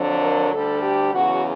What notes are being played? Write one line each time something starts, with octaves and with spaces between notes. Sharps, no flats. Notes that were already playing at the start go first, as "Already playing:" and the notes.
Already playing: F2 D3 F#3
A#4
D2 D3 G3 A4
G4
E2 C#3 F#3 F#4